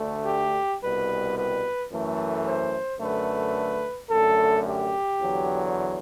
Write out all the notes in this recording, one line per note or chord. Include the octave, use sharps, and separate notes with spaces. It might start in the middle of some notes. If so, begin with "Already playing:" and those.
Already playing: D2 D3 A3
G4
C2 B2 G3 B4
B4
F#2 E3 A3
C5
F#2 D3 A3 B4
F#2 D3 A3 A4
G4
E2 D3 F#3